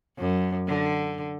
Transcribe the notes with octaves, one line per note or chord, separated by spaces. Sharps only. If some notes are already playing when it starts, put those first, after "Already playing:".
F#2
D3